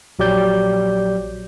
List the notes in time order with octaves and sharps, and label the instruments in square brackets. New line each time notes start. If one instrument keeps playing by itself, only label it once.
[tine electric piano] A#1 F#3 G4 D5 G6